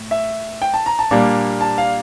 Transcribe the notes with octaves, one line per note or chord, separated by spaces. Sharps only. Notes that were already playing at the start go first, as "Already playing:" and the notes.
Already playing: A2
E5
G5
A5
A#5
A5
A#2 G3 A#3 D4
A5
F5